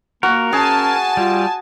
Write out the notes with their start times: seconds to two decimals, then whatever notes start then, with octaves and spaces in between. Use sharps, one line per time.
0.23 A#3 F#4 A#4
0.53 C#4 G#4 G#5 A5
1.17 G3 F4